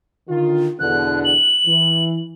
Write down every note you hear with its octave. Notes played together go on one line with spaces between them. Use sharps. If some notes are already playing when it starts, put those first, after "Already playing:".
D3 D#3 F4
E2 B2 D3 F#6
F#7
E3